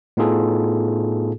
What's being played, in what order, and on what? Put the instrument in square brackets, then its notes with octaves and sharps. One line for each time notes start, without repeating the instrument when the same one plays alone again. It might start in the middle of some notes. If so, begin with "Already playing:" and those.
[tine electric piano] A2 B3 D#4 F4 G#4 A4